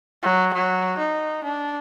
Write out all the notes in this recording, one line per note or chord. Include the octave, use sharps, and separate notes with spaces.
F#3
F#3
D#4
D4